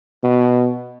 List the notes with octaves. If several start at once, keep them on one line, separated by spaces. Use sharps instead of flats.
B2